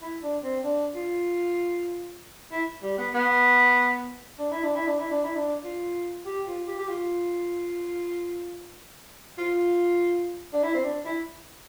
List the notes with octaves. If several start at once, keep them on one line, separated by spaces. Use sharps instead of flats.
E4
D4
C4
D4
F4
E4
G3
B3
B3
D4
E4
D4
E4
D4
E4
D4
E4
D4
F4
G4
F4
G4
G4
F4
F4
D4
E4
C4
D4
E4